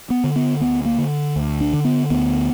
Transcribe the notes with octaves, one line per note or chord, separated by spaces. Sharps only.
B3
D3
B3
D2 B3
A#3
D3
D2
D4
D3
B3
D2 B3